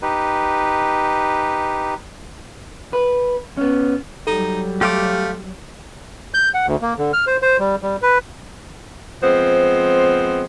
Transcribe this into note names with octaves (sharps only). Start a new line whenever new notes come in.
D#4 G4 B4
B4
B3 C#4
F#3 G3 D#4 A4
A3 G4 F5 C6 D6
G6
F#5
D2
A#3
D3
F6
C5
C5
G3
G3
B4
F3 G#3 B3 C4 C5